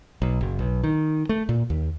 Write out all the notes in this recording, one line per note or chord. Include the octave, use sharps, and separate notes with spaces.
B1
F#1
B1
D#3
A3
A#2
D#2